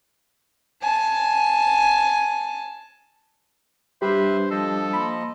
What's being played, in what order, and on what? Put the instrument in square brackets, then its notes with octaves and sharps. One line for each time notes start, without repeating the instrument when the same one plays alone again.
[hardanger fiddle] G#5 A5
[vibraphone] G3 D4 [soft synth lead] G4 [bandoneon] B4 E5 B5 [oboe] C5
[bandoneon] F3 D#5 [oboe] A4
[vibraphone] A#3 C6 [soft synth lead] B5